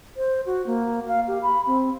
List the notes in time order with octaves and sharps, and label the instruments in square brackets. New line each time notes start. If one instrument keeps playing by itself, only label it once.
[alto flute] C5
F#4
A#3
F5
G4
B5
C4